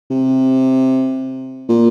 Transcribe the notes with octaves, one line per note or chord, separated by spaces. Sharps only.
C3
A#2